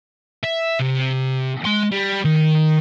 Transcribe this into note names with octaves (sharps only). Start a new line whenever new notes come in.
E5
C3
G#3 C6
G3
D#3